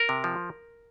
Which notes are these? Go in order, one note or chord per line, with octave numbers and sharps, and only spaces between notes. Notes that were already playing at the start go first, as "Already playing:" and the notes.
Already playing: A#4
C3
F3